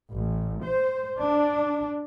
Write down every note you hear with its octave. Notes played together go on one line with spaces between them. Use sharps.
A1
C5
D4